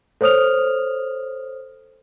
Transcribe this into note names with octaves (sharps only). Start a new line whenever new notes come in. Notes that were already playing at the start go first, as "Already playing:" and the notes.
A4 C5 C#5 D#6 F6 F7